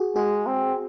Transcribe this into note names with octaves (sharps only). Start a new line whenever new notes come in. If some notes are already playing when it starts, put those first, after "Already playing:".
Already playing: F#4 G#4
G#3 F#4 G#4
C4